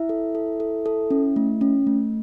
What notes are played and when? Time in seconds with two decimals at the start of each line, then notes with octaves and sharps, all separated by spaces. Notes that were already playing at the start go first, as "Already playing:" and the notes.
Already playing: E4 E5
0.09 A4
0.35 A4
0.60 A4
0.86 A4
1.10 C#4
1.36 A3
1.61 C#4
1.87 A3